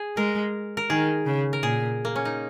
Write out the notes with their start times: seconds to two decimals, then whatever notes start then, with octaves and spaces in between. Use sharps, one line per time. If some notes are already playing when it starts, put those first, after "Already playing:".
Already playing: G#4
0.17 G#3 A#4
0.77 A#4
0.90 D#3 G#4
1.26 C#3
1.53 A#4
1.63 A#2 G#4
2.05 A#3
2.16 C#4
2.25 D#4